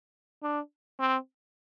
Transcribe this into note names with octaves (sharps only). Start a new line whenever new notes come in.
D4
C4